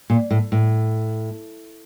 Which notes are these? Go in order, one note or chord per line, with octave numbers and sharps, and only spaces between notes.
A#2
A2
A2